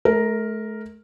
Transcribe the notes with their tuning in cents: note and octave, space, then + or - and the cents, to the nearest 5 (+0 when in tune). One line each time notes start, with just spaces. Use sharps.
A3 -35 A#4 +0